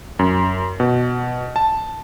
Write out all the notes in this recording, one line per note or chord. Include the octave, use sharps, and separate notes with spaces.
F#2
B2
A5